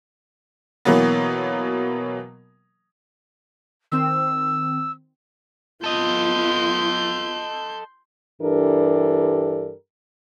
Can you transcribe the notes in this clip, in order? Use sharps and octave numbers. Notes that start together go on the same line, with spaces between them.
B2 E3 F#3 A#3 B3
D#3 C4 E6
B3 F4 A4 D#5 C6 G6
G2 E3 D4 G4 A4 A#4